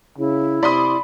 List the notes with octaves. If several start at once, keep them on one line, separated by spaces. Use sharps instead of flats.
C#3 E4
C3 D5 B5 C6 D#6